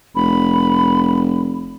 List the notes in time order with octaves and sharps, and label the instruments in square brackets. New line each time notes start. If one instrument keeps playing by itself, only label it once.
[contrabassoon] F1 [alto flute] B5